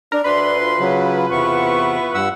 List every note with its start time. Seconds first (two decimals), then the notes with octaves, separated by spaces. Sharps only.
0.12 D4 A#4
0.24 D2 D4 B4 C6
0.61 F4
0.80 C#3 F#3
1.31 E2 C3 B3 E4 C#6
2.14 G2 F#5 E6